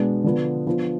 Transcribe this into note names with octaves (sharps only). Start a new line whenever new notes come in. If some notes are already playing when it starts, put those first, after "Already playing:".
Already playing: B2 G#3 B3 D4
D3 F3 B3
F3 B3 D4